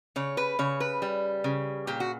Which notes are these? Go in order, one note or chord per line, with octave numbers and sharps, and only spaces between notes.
C#3 C#5
B4
C#3 C#5
B4
G3
C#3
A#2 G4
F#4